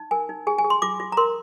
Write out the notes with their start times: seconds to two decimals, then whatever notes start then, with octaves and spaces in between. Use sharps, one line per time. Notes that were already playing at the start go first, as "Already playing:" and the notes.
Already playing: D#4
0.11 A#4 G#5
0.29 D#4
0.47 G#4 G#5
0.58 G#5
0.64 G#4
0.70 C6
0.82 F4 D6
1.00 F4
1.12 A#5
1.17 A#4 C6